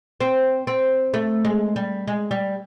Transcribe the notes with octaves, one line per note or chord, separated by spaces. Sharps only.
C4
C4
A3
G#3
G3
G#3
G3